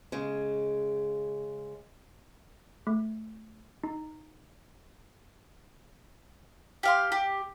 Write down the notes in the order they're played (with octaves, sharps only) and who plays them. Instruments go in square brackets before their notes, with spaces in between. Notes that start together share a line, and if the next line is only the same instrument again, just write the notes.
[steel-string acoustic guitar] C#3 G#3
[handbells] A3
D#4
[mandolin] G4 F5 C6
G4